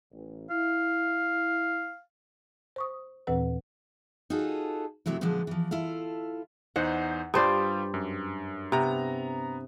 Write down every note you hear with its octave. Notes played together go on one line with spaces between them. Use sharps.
A1
E4 F5
C5 C#6 D#6
D#2 A#2 E3 C4 B4 F#5
D#4 F4 F#4 G#4 A4
F2 C3 F#3 A3 E4
A#2 D3 F3 F#3 G#3 B3
E3 F3
E4 F4 A4 F5
E2 D#4 C5 F#5
G2 G3 F4 C5 D5 D#6
F#2
C3 B3 A#5